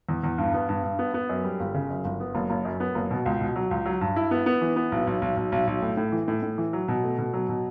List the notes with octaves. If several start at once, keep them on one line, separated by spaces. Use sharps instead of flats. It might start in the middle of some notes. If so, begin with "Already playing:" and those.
E2
E2
G2
B3
G2
G2
B3
B3
F#2
G3
G1
C#3
F#2
G1
B3
F#1
F#1
F#2
B3
F#1
B2
C#2
B2
F#3
C#2
F#3
G2
E4
B3
B3
E3
B3
B1
B1
B1
B1
B1
B1
A2
A2
E3
A2
A2
E3
F#3
B2
A3
B2
F#3
B2